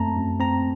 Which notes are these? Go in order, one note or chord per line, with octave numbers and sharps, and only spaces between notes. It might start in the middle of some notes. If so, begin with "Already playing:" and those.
Already playing: F#2 A3 C4 A5 A#5
F#2
C4 A#5